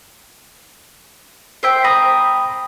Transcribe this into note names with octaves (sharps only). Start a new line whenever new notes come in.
C5 E5 G5
G5 A#5 B5 D#6